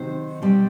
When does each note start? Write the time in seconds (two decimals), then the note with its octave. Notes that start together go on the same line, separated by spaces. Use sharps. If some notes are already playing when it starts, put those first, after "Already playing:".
Already playing: C3 D#3 F#3 C4 D#4 C5
0.42 B2 G3 C4